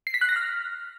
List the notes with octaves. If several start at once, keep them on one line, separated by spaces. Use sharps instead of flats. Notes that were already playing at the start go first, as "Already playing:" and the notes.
C7
B6
F#6
A#6
F6